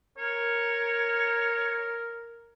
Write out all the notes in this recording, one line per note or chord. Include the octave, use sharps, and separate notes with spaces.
A#4 C#5